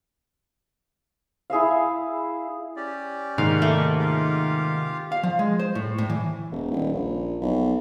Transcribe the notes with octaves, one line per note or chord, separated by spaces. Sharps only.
E4 G#4 E5 F5
C#4 G4 D5
G#2 C3 D#3 A#3 F5
A3
F4 G4 F5
F5
F3
G#3
C5
A2
A2
E3
E1
D#1
A#1
B1